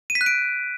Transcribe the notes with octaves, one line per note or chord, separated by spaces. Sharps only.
D#7
B6
F#6
D7